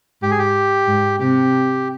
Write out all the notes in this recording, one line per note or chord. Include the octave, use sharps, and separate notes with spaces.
G#2 G4
G#4
G4
G#2
C3 G4